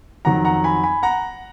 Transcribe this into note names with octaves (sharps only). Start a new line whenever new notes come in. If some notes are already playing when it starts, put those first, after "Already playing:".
F2 D#3 F#3 F#5 A#5
F#5 A#5
G#5 B5
G#5 B5
F#5 A#5